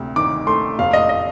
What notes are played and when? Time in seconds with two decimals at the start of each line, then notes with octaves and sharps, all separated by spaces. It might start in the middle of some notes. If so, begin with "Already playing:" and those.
Already playing: D2 C3
0.16 D#3 D6
0.47 A3 C6
0.79 F1 F5
0.93 D#5
1.09 D#5